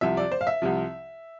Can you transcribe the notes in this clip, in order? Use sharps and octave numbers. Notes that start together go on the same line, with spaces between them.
C2 C3 F3 E5
D5
C5
F5
E5
C2 C3 F3